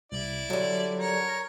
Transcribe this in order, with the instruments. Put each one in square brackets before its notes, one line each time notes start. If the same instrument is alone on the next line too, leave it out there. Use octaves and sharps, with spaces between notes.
[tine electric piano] C2 [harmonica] E4 D5
[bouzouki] D3 G3 [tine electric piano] F#3
[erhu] A#4 [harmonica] C#5